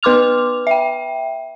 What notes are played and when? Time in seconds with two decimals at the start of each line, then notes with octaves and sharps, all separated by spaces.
0.03 B3 B4 C6 D6 F6 F7
0.67 E5 G5